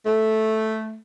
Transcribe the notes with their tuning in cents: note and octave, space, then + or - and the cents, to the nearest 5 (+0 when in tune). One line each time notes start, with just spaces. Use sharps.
A3 -5